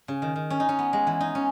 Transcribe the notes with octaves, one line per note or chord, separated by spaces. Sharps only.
C#3
D#3
D#3
C#4
D#4
C#4
B3
G#3
E3
D#4
C#4